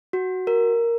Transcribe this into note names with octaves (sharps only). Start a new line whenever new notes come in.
F#4
A#4